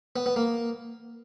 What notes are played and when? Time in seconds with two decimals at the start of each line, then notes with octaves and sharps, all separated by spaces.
0.16 B3
0.26 B3
0.36 A#3